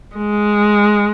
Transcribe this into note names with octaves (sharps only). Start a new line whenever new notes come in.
G#3